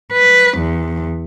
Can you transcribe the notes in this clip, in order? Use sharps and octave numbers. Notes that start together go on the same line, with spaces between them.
B4
E2